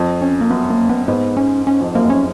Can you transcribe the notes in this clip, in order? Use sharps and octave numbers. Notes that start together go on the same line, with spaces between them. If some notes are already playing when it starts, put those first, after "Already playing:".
Already playing: F2
C#4
A#3
F#2 B3
A#3
B3
G#2 B3
C#4
C#4
F2
F#2 A#3
C#4